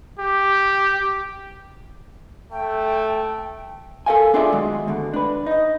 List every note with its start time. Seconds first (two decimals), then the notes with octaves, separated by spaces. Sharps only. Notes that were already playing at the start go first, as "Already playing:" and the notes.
0.19 G4
2.51 A3 G5
4.06 A4 A#4 D#5 F5 G#5
4.33 B3 D4 F4 G#4 D5 E5
4.52 D#3 F#3 G#3
4.88 D2 B2 D3
5.14 D4 B4
5.46 D#4 D#5